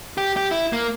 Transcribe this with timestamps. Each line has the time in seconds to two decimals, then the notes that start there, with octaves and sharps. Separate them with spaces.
0.18 G4
0.36 G4
0.51 E4
0.73 A#3